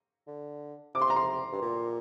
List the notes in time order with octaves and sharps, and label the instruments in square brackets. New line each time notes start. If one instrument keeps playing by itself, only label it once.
[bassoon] D3
[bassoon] C3 [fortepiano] D6
[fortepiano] C6
A#5
C6
[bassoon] G2
A#2